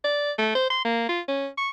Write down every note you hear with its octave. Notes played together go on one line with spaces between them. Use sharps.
D5
A3
C5
C6
A#3
F4
C#4
C#6